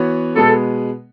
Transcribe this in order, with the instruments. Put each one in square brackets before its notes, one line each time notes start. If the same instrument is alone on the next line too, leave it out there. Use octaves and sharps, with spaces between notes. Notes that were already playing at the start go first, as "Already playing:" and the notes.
Already playing: [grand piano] E3 B3 F#4 C#5
[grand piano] B2 G#3 B3 [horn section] A4